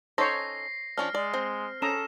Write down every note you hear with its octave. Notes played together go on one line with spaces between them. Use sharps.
C#4 D#4 A4 C5 C#5 A#6 C7
F3 C#4 D4 F6
G#3 D5
C4
C#4 A4 A#5 D#6 E7